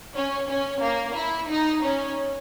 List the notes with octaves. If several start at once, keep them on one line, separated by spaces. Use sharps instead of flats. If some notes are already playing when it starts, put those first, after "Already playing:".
C#4
C#4
A#3
E4
D#4
C#4